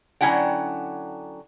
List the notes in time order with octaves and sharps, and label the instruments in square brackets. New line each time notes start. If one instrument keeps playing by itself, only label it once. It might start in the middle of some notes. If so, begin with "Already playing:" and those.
[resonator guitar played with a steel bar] D3 F#3 C#4 E4 F#5 G5